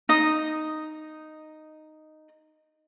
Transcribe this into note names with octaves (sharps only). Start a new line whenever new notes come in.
D#4 D#6